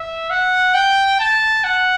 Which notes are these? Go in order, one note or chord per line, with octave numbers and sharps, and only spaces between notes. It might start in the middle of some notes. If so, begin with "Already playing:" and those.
Already playing: E5
F#5
G5
A5
F#5